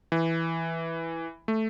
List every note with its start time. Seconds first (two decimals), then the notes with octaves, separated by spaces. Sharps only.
0.12 E3
1.48 A3